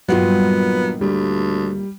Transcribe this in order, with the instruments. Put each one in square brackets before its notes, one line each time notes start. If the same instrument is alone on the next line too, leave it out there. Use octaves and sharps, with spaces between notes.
[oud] G2 A#2 D#3 [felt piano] F#3 F4 [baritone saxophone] B3
[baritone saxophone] D2 [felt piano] G3